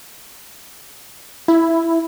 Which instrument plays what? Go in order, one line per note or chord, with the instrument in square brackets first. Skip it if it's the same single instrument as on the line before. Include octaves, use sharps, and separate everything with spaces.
[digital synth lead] E4